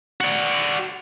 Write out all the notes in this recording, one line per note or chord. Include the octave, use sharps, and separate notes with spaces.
F#4 D5